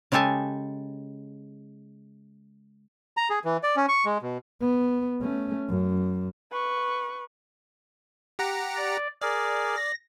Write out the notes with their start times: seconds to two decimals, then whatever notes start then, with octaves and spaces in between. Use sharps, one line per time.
0.12 C#3 G#3 G4 A4 G#5 A5
3.17 A#5
3.30 G#4
3.45 E3
3.63 D5
3.76 C#4
3.89 C#6
4.05 G#3
4.22 B2
4.61 B3
5.21 A3 C#4
5.68 F#2
6.53 B4 C#6
8.39 G4 F#5 A#5
8.77 D5
9.22 G#4 A#4 D5
9.76 A#6